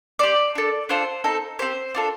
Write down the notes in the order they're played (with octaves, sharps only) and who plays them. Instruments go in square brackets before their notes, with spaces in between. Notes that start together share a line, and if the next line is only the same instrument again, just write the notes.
[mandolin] C4 G4 D5
D4 A4
D4 F4 A4 C5
C4 D#4 A4
C4 G4 C5
D4 F4 A4